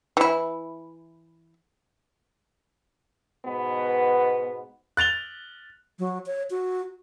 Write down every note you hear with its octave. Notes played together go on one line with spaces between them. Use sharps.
E3 E4
G#2 B2 B3
F#6 A6 F7 G7
F#3
C#5
F#4